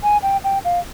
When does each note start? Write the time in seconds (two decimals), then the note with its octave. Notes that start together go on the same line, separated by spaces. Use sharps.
0.03 G#5
0.23 G5
0.44 G5
0.65 F5